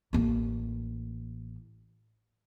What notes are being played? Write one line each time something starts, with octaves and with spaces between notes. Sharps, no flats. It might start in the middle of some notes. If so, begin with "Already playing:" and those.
A1 A#3